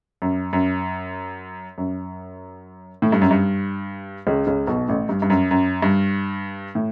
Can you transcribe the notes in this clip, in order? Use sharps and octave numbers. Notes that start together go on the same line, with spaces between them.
F#2
F#2
F#2
A2
G2
F#2
G2
C#2 C#3
C#2 C#3
B1 B2
A1 A2
G2
G2
F#2
F#2
G2
A2